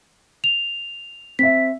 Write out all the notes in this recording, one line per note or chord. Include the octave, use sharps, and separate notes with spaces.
F7
C4 E5 B6